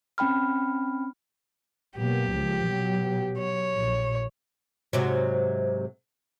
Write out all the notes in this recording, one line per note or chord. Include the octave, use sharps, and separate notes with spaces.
C4 C#4 G5 B5 F6
B2 F#3 A#3 G4
C#2 F3
B2 F#3
C#5
A#1
G#2 C3 F#3